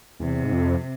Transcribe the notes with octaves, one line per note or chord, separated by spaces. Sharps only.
E2 C3
G#2
F2